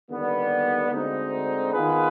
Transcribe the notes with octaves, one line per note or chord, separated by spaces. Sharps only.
D#2 D3 G3 B3
D2 D3 G#3 C4 D#4
D#3 B3 F4 G#4 B4